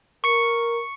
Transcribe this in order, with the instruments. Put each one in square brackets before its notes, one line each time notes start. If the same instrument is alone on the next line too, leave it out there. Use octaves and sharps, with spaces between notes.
[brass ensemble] A#4 [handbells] C#6 C#7